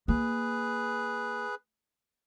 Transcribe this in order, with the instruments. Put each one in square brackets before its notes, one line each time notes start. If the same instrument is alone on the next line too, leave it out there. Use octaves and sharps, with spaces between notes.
[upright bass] A#3 [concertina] G#4 B4